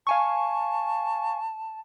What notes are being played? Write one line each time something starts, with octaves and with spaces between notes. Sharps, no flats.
F5 G#5 A5 C#6